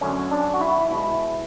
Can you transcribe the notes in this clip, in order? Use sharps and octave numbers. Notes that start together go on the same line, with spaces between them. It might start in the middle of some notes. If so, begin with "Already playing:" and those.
F#2 D3 F#3 A3 C#4
D4
F#4
E4
B2 G#3 E4